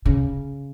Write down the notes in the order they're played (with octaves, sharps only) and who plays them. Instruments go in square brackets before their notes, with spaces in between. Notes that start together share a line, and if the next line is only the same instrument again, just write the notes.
[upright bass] C#3